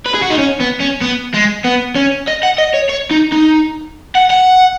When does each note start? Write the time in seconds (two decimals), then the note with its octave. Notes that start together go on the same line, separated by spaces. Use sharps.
0.06 B4
0.15 G#4
0.23 F#4
0.31 D#4
0.39 C#4
0.61 B3
0.80 C#4
1.01 B3
1.34 G#3
1.64 B3
1.95 C#4
2.27 D#5
2.43 F#5
2.58 D#5
2.74 C#5
2.89 C#5
3.11 D#4
3.32 D#4
4.15 F#5
4.30 F#5